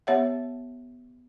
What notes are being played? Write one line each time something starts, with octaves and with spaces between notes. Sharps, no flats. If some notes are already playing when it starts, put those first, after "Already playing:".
B3 G4 C#5 E5 F#5